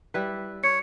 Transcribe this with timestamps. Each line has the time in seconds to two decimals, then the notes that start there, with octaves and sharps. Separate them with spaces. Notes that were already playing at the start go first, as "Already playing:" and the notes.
0.14 G3 E4 B4
0.64 C#5 C#7